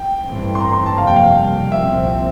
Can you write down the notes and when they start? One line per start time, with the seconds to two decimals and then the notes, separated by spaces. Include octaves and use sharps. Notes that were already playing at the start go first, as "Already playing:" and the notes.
Already playing: G5
0.23 A1 G2 E3 A3 C4
0.55 C6
0.60 A#5
0.73 C6
0.86 A5
0.97 F2 C3 G3 A#3 F5
1.07 G5
1.16 F5
1.72 C2 A#2 F3 C4 E5